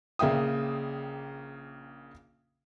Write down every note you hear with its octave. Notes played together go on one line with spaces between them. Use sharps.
A#1 C#3 A#3 E5 G5 D#6